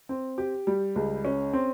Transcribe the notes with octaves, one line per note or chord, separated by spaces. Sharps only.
C4
G4
G3
C#2
C#4
C4